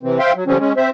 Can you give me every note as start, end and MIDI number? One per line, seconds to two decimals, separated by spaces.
0.03 0.18 48
0.03 0.18 52
0.03 0.18 60
0.19 0.32 72
0.19 0.32 76
0.19 0.32 77
0.19 0.32 79
0.19 0.32 84
0.35 0.44 54
0.47 0.58 50
0.47 0.58 53
0.47 0.58 55
0.47 0.58 60
0.47 0.58 61
0.59 0.73 56
0.59 0.73 61
0.77 0.90 60
0.77 0.90 72
0.77 0.90 76